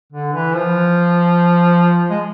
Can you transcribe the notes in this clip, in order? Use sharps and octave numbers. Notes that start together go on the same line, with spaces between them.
D3
E3
F3
G#3